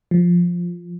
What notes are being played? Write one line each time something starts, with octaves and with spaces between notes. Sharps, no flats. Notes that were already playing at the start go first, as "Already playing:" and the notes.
F3